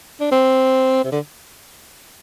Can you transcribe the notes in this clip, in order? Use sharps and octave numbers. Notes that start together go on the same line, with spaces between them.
D4
C4
C3
D3